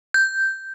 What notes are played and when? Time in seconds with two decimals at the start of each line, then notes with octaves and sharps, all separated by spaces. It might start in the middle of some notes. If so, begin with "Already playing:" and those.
0.14 G6